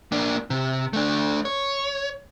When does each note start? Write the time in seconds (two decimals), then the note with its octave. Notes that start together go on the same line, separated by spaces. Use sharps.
0.12 A#3 D4
0.50 C3
0.93 A3 D4
1.45 C#5